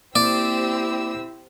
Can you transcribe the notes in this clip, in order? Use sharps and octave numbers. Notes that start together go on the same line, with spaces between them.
A#3 C4 E4 G4 D5 E6